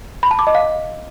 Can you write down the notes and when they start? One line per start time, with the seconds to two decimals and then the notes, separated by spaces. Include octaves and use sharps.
0.23 B5
0.31 A5
0.39 D6
0.47 D#5
0.55 F5